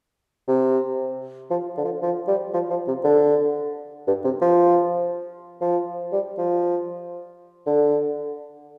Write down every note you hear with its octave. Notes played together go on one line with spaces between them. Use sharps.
C3
F3
D3
F3
F3
G3
F3
F3
C3
D3
G2
C3
F3
F3
G3
F3
D3